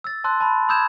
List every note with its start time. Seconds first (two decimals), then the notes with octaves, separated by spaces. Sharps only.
0.04 E6 A6
0.24 A5 C6 E6 F#6
0.40 A5 B5
0.69 B5 D#6 E6 G6 G#6 E7